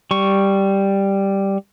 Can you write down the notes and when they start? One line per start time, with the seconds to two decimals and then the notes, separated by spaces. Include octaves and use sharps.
0.11 G3 C#6